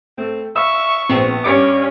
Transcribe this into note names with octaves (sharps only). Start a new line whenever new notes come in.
A3 C4
E5 F5 B5 C#6 E6
A#1 B3 C4
G2 C#4 D6 C#7